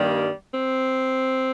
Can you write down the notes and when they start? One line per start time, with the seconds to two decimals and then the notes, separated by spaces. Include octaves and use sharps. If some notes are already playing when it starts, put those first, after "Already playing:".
Already playing: G2 D#3 G3 A#3
0.53 C4